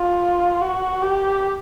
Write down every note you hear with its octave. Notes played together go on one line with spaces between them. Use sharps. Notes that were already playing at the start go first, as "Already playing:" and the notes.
Already playing: F4
F#4
G4